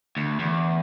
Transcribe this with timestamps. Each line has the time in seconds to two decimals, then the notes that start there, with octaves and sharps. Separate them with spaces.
0.17 D2
0.39 E2